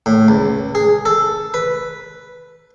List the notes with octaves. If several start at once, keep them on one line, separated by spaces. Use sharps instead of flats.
A2
C#2
G#4
A4
B4